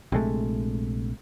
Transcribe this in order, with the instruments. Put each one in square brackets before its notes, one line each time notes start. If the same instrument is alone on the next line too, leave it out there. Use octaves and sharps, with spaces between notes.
[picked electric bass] A#1 C3 G#3 A3